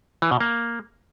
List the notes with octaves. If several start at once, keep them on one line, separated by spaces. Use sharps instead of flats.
E3
B2
A#3